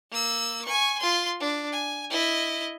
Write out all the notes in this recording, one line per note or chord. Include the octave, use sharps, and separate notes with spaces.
A#3 E6
G#5 C#6
F4 C6
D4
G#5
E4 D#5